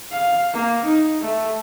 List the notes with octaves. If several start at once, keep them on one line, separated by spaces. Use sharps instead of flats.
F5
A#3
D#4
A3